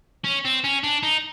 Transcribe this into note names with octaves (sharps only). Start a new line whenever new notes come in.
C#4
C4
C#4
D4
D#4